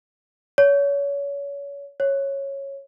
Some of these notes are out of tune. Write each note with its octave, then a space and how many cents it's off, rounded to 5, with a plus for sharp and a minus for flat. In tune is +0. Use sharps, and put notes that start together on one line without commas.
C#5 +30
C#5 -10